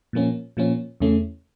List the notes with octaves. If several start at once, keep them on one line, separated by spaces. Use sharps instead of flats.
A#2 F3 A#3 C#4
A#2 F3 A#3 C#4
E2 C#3 E3 A3 C#4